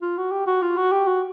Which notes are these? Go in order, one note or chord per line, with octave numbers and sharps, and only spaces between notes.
F4
F#4
G4
F#4
F4
F#4
G4
F#4